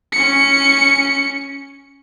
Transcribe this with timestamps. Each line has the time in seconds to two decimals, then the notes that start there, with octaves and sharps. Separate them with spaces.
0.13 C#4 C#7